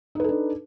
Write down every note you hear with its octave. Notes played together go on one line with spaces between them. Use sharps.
D4 D#4 A4 B4